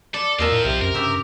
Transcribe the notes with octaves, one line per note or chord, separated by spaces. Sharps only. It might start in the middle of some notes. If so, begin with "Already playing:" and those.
A4 D5
D#2 C4 F4 A#4 D#5 E5 A5
A2
B1 C3
F#2 A#4
G2 C#3 G4 E5